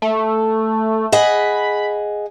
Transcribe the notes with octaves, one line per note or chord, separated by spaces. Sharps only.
A3
G#4 D#5 F#5 B5